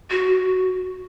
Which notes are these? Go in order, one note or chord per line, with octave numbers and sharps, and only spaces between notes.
F#4